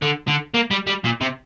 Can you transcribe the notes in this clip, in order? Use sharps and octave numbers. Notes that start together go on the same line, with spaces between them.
D3
D3
A#3
G3
G3
A#2
C3